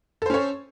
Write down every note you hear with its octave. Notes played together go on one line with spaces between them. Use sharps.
C#4 A4 C5 C#5